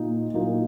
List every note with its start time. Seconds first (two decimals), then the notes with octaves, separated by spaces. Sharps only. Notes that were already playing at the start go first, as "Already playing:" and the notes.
Already playing: A#2 D#4
0.34 A#2 F#3 A#3 D#4